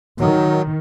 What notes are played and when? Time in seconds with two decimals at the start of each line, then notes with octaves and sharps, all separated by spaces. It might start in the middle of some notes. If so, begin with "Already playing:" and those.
0.20 D#3 F#3